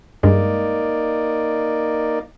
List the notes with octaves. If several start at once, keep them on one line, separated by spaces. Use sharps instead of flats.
G2 G#3 A#3 D#4 D5